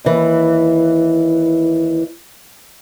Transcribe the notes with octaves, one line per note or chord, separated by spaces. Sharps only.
D#2 E3